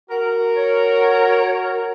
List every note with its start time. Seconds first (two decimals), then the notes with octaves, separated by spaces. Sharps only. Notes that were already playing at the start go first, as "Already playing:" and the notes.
0.10 F#4 A#4
0.56 C#5